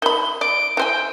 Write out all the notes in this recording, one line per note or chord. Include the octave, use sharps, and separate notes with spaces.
D#3 B5 G7
D5 D7
E3 C5 G5 G#5